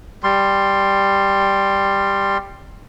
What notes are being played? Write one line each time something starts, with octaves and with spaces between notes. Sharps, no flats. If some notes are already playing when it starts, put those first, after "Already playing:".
G3 C6